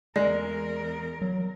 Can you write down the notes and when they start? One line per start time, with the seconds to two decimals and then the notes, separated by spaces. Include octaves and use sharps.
0.16 E2 G#3 A#4 D5
1.22 F#3